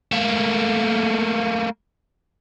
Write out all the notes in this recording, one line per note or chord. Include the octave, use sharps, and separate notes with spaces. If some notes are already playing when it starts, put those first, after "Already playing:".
A3 A#3